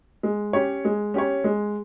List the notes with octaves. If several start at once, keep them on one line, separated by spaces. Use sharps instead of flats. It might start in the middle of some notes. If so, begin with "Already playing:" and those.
G#3
C#4 G4 C#5
G#3
C#4 G4 C#5
G#3